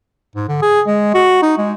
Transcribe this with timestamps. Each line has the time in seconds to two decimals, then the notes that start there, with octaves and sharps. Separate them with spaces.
0.36 G#2
0.48 D3
0.62 G#4
0.87 G#3
1.14 F#4
1.42 D#4
1.58 G#3